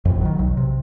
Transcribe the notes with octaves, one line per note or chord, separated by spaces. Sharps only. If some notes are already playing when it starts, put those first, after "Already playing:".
A1 F2
D#3 F#3
B1
C3